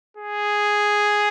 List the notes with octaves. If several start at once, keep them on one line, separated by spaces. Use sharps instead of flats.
G#4